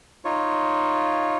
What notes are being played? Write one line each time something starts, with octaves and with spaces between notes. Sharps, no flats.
D#4 F4 C#5